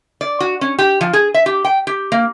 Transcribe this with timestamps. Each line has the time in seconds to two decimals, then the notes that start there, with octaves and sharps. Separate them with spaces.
0.21 D5
0.40 F#4
0.61 C#4
0.79 G4
1.01 F3
1.13 G#4
1.34 E5
1.46 G4
1.65 G5
1.87 G4
2.12 A#3